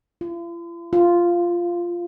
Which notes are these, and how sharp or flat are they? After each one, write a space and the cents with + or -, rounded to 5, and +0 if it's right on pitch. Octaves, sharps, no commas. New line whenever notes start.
F4 -45
F4 -5